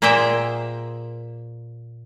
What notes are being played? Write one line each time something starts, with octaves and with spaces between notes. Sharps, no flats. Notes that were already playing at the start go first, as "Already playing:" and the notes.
A#2 A#3 G#4 C5 E5 G5